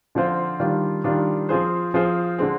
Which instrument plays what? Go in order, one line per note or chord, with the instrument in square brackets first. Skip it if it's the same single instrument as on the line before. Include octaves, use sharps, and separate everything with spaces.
[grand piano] D3 F3 C4 F4 C5
D#3 G3 D4 F4
D#3 G3 D4 F4
F3 C4 F4 G#4 C5
F3 C4 F4 G#4 C5
D3 G#3 C4